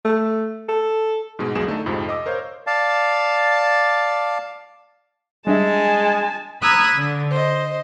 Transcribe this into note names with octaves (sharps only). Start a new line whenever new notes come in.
A3
A4
G#2 B2 G#3
B1 E2 B2 G#3 G#4 E7
D3 A3 D#4 A4
F2 G#2 C3 F3
D#5 D6 E6
A#4 C5 C#5 F5 G6
D5 F5 A5
G3 G#3 D4 E5 G#5 A5
A#5 B5 D#6 E6 F#6 G#6
D3
C5 D#5